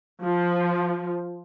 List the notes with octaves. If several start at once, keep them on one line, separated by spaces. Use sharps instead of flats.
F3